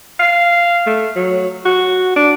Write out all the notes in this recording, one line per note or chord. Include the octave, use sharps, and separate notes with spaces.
F5
A3
F#3
F#4
D4